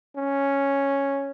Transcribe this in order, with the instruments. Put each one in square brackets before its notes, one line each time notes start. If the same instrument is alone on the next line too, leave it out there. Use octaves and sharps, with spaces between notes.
[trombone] C#4